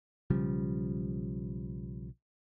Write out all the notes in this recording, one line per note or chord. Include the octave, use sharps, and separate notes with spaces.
B1 C#3 F3 G3